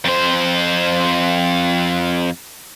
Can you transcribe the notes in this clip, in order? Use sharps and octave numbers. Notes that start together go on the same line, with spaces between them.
F2 C5